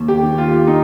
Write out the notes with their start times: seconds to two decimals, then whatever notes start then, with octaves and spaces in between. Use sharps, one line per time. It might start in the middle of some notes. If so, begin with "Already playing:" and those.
Already playing: D#2
0.08 G4
0.23 D#3
0.38 F4
0.67 D#4